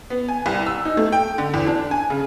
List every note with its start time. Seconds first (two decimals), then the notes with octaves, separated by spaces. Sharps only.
0.10 B3
0.29 G#5
0.46 C2
0.66 E6
0.85 D#4
0.97 A3
1.12 G5
1.38 D3
1.54 E2
1.67 D4
1.91 G#5
2.10 C#3